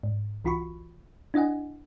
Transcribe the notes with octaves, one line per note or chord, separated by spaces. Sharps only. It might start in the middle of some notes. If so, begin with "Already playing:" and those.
G#2
C2 E3 F4 F#4 B5 C#6
D4 E4 D#5 F#5 G#5